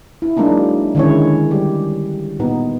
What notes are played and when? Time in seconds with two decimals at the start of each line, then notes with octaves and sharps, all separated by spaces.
0.22 E4
0.37 F#3 G#3 A#3 D4 D#4
0.95 D3 D#3 G#3 C#4 E4 C#5
1.51 G3 G4
2.39 A#2 B3 D#4